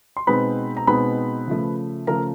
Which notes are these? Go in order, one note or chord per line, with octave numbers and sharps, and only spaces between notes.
C6
B2 G#3 C4 D#4 B4 B5
A#5
B2 G#3 C4 D#4 B4 B5
C#3 F3 A3
C#3 F3 A3 A#4 A#5